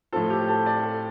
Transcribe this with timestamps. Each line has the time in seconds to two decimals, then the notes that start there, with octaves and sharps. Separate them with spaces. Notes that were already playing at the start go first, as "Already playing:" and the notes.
0.13 A2 F3 C4 F4 A4
0.30 G4
0.48 A4
0.66 D5
0.83 A4